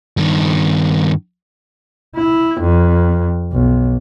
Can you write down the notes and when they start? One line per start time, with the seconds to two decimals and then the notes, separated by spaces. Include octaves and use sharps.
0.17 G2 D#3
2.15 E4
2.61 F2
3.53 B1